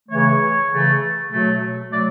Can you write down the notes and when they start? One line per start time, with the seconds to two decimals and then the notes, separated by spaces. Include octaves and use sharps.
0.08 C#3 E3 A3 C#5
0.69 C#3 E3 A3
1.29 B2 F#3 A3
1.89 B2 F#3 A3 D5